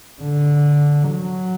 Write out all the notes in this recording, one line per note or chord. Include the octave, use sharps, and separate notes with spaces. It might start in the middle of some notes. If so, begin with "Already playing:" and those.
D3
F#3